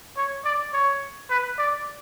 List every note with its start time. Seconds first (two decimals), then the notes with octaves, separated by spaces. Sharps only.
0.17 C#5
0.45 D5
0.73 C#5
1.30 B4
1.58 D5